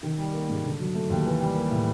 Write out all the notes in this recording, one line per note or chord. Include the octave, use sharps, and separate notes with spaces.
D#3
G3
A#3
G#2
D3
F#3
A3
D#2
E3
G3
A#3
A2